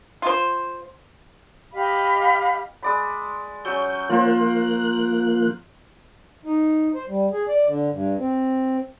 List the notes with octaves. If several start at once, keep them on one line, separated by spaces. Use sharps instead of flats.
F4 C5
G4 D#5 F5 B5
G#3 D5 B5
F#3 C#4 G6
F3 A#3 F4 A#4 C5 F#6
D#4
C5
G3
G#4
D5
D3
G2
C4